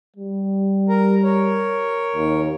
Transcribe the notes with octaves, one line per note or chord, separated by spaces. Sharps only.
G3
A#4 A#5
A#4 C#5
D#2